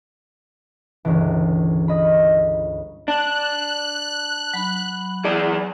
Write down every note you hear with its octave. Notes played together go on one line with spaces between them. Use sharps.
G1 C#2 E3
D#5 B5
D4 F#6
F#3 B5
E3 G#4 D5